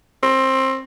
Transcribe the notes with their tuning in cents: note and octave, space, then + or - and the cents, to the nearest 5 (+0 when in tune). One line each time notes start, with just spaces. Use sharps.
C4 +20